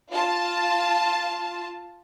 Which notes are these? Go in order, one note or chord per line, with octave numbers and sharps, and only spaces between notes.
F4 A5